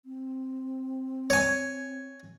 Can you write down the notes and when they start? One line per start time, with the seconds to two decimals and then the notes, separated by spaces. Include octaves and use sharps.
0.05 C4
1.30 C#5 G#5